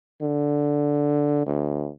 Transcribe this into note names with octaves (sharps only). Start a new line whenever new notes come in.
D3
D2